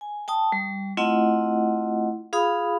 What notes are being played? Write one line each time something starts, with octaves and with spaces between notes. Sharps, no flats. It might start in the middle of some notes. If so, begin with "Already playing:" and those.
G#5
G5 A5 D#6
G3
A3 C4 E4 F4 D#5 F#5
F4 G#4 F5 B5 D#6